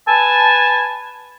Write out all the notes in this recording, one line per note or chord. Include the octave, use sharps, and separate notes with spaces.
B4 G#5 A5